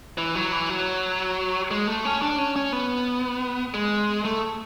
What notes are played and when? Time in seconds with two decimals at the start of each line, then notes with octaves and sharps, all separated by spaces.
0.18 E3
0.35 F#3
0.52 E3
0.69 F#3
1.71 G#3
1.87 A3
2.05 C#4
2.22 D4
2.38 C#4
2.56 C#4
2.72 B3
3.74 G#3
4.25 A3